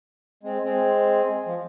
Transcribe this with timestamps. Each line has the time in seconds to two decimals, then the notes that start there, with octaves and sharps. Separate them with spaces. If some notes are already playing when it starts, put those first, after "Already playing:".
0.43 G#3 C4
0.64 G#3 C4
1.46 F3